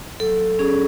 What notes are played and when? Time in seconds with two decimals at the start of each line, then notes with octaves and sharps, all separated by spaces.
0.20 F#3 A4
0.59 C#4 G#4